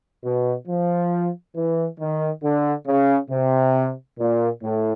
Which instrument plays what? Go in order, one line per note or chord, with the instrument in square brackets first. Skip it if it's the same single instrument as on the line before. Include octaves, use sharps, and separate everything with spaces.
[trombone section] B2
F3
E3
D#3
D3
C#3
C3
A#2
A2